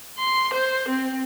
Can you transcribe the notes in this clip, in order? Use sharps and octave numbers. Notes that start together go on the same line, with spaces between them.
C6
C5
C4